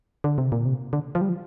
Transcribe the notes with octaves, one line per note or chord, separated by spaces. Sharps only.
D3
C3
A#2
C3
D3
F3
G3
F3